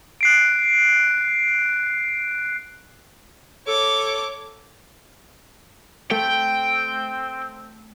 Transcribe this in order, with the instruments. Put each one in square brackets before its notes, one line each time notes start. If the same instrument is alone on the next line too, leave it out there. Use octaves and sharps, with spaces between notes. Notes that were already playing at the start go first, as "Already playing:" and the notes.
[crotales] F#6 C7 D7
[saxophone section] A4 [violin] C#5 D6
[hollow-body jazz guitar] A3 [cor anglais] C4 [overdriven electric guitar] G5